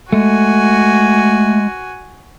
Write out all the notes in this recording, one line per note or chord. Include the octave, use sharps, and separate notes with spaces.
G#3 A3 F#4 G#5